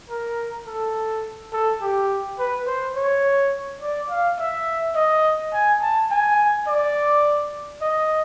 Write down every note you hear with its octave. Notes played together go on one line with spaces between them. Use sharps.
A#4
A4
A4
G4
B4
C5
C#5
D5
F5
E5
D#5
G#5
A5
G#5
D5
D#5